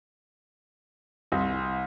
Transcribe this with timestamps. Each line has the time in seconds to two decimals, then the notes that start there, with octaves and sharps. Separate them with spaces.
1.32 C2